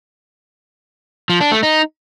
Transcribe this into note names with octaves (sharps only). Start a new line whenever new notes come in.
F3
D4
A3
D#4